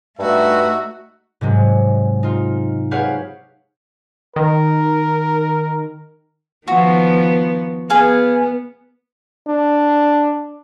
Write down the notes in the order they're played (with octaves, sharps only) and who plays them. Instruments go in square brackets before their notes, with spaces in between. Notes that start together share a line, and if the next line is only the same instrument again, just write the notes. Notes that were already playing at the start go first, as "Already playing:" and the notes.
[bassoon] G2 [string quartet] A3 D#4 F#4 [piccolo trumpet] E5
[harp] G#2 C3 F#3 G#3
D#4 F4
G4 G#4 B4 C#5 F5 F#5
[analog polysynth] D#3 [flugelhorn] A#4
[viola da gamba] D#3 F3 B3 [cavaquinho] F#4
[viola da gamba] B3 [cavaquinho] G#4 F5 G#5
[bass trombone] D4